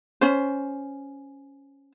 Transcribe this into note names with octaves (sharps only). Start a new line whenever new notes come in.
C#4 C5